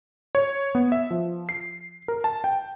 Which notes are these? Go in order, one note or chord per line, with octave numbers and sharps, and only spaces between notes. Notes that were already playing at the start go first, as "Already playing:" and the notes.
C#5
B3
E5
F3
C7
A#4
A5
G5